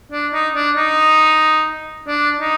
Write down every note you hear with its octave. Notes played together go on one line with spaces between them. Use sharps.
D4
D#4
D4
D#4
D4
D#4